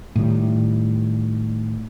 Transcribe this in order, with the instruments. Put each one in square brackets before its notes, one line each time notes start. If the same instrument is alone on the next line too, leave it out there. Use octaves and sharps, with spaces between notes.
[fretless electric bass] A2 D#3 G3